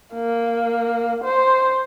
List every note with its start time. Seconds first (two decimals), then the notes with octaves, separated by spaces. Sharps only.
0.14 A#3
1.24 C5